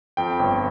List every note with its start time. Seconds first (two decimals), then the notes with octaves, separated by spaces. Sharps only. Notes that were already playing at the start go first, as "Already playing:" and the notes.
0.17 F2 G5
0.39 G1